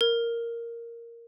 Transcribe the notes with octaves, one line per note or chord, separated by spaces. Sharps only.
A#4